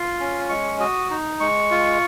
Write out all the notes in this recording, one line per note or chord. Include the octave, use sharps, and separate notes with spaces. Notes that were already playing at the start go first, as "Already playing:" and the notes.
Already playing: F4 C6
C#4
G#3 C#6
F#4 D#6
D#4
G#3 C#6
F4